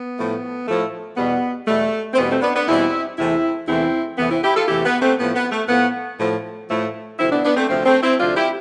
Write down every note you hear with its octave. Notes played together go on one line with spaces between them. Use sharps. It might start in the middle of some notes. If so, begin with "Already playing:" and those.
Already playing: B3
A2 F3 A3
A2 F3 A3
E2 B2 G3 B3
E2 B2 G3 A3
C4
E2 B2 G3 B3
A3 C4
B3 D4
B3 D4
E2 B2 G3 C4 E4
E2 C3 E3 A3 C4 E4
E2 C3 E3 A3 C4 E4
E2 C3 E3 A3 B3
C4 E4
E4 G4
F4 A4
E2 C3 E3 A3 E4 G4
B3
A3 C4
A2 F3 A3 B3
B3
A3
A2 F3 A3 B3
A2 F3 A3
A2 F3 A3
D2 C3 F3 C4 E4
B3 D4
B3 D4
A3 C4
D2 C3 F3 A3 C4
A3 C4
C4 E4
D2 C3 F3 D4 F4
E4 G4